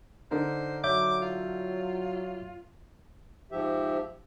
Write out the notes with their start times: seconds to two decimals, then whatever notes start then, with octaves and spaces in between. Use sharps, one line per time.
0.31 D3 D#4 A#4 C5
0.84 F#3 C#5 E5 D6 G6
1.22 F4
3.52 G#2 F3 G4 E5